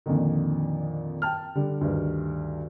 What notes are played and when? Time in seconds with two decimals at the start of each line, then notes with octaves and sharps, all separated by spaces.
0.06 F2 A#2 D3 D#3
1.22 G5 A5 F6
1.55 D3 G3
1.81 D2 G2 D#3